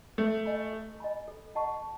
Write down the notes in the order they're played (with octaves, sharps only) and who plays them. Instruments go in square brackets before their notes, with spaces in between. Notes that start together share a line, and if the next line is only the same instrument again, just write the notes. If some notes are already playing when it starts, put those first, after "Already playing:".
[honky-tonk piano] A3 [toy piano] A4
[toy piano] D#5 G#5 B5
A4
D#5 G#5 B5
A4
D#5 F#5 A5 C#6